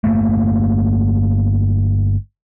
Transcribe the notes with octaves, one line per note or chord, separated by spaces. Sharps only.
G1 A3 A#3